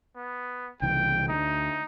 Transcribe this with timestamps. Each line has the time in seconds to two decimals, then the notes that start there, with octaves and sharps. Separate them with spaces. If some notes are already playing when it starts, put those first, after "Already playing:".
0.16 B3
0.82 C2 C#3 E3 G5
1.29 D2 D#4